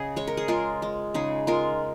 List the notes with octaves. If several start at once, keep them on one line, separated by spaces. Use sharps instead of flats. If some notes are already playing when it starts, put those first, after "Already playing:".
Already playing: C#3 G#4 D#5
G#3 C#5
A#4
G#4
G#3 F4 A#4
G#3
C#3 D#4 G#4
G#3 F4 A#4